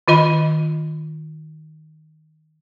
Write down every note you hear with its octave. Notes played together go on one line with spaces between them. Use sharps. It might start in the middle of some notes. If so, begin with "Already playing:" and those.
D#3 F4 D#5 B5